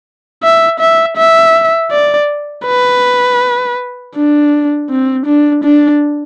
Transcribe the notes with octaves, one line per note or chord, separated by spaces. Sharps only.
E5
E5
E5
D5
B4
D4
C4
D4
D4